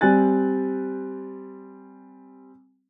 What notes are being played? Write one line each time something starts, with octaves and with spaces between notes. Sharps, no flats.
G3 C4 G#5 F#6 A6